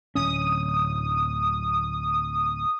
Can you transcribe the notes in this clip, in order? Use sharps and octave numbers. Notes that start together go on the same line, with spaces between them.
D1 C#4 D#6